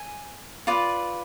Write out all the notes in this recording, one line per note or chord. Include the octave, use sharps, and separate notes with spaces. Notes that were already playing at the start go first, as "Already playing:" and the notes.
Already playing: G#5
F4 B4 D5